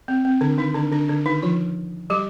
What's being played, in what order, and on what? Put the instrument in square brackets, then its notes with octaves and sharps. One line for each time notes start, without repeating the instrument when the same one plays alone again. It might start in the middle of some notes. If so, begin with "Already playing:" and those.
[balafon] C4
C4
D3 D4
D#3 D#4
D3 D4
D3 D4
D3 D4
D#3 D#4
F3 F4
G3 G4